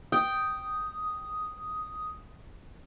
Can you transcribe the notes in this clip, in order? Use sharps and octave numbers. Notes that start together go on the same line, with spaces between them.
G5 D#6